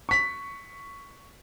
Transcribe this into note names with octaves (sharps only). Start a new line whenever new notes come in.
C#6 B6